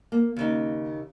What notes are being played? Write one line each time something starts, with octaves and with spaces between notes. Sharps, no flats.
A#3
D#2 C#3 D#4